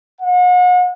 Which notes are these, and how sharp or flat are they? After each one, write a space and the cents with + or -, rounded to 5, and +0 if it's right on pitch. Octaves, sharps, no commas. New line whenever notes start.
F#5 -40